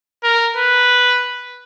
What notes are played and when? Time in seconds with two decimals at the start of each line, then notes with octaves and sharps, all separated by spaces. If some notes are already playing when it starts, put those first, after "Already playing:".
0.23 A#4
0.57 B4